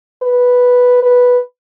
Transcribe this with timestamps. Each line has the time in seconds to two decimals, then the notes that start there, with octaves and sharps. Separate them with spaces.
0.22 B4
1.03 B4